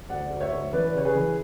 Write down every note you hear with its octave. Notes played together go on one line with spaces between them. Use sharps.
D2 D5 F#5
D2
C#5 E5
D2
E3 B4 D5
C#3 C#5
G#4 B4
E3